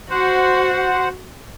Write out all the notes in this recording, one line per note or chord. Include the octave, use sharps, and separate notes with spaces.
F#4 C5 F#5